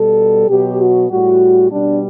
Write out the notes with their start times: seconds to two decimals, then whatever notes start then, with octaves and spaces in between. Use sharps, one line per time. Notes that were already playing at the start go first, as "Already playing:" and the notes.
Already playing: B2 G3 A4
0.48 B2 F#3 G4
0.78 F#4
1.09 A2 G3 F#4
1.70 B2 G3 D4